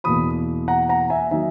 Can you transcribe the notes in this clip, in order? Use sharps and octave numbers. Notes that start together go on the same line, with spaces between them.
E2 B2 A#3 B5 D#6
F#5 A#5
F#5 A#5
E5 G#5
D#3 F#3 A#3 D#4 E5 G#5